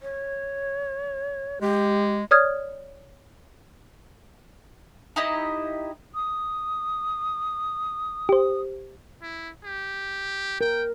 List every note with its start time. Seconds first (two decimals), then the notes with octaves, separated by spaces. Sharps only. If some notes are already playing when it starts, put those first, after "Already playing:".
0.01 C#5
1.61 G#3 G4
2.31 C#5 D5 D#6 F6 G#6
5.16 D#4 E4 G4 D#5
6.15 D#6
8.29 G4 C5
9.22 E4
9.64 G4
10.61 A#4 G5